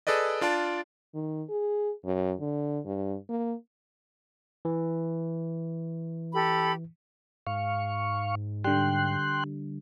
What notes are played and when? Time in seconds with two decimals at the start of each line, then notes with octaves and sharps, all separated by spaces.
0.07 G#4 A4 B4 D5 D#5
0.41 D4 F4 D5 A5
1.15 D#3
1.50 G#4
2.05 F#2
2.40 D3
2.85 G2
3.29 A#3
4.65 E3
6.33 G4 A4 B5
7.47 G#2 F5 C#6
8.64 D3 G3 G5 C6 F#6